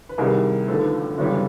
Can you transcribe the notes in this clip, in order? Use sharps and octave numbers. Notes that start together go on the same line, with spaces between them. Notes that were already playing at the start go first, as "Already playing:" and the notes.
B4
C2 C3 D#3 G3 G#4 A#4
D#2 D3 F3 A3 A4 B4
G1 F#2 C#3 E3 G3